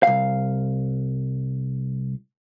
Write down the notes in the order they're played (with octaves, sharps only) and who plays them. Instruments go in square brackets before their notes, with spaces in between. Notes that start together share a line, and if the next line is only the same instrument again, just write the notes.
[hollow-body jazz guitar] C2 F5